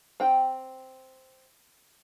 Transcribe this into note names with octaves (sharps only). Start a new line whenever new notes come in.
C4 G5